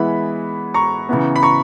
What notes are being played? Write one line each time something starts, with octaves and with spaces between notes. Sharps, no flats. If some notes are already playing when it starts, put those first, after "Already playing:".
Already playing: E3 G#3 B3 E4 B5
A#5 C#6
C#3 E3 B3
B5
A#5 C#6